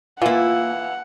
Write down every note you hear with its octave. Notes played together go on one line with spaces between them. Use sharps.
E3 A#3 E4 F4 F5 F#5